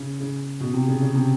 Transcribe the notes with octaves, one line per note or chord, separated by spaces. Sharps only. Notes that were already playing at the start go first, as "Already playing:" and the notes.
Already playing: C#3
C#3
B2
C3
C#3
C#3
C3